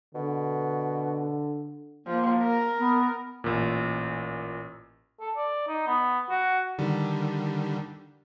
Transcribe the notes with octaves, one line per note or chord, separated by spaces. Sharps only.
B2 D3
F3 A#3
A#4
B3
A1 A#2
A4
D5
D#4
B3
F#4
D3 D#3 G3